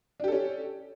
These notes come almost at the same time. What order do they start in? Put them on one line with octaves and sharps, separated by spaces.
D4 G4 A4 C#4